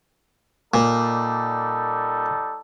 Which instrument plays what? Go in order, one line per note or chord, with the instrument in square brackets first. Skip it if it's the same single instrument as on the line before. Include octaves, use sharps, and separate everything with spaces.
[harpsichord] A#2 [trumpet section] G3 D#4 A4